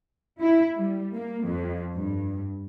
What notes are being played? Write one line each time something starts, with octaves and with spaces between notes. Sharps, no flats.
E4
G3
A#3
F2
G2